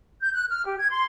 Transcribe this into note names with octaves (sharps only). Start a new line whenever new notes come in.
G6
F#6
F6
G4
G#6
C6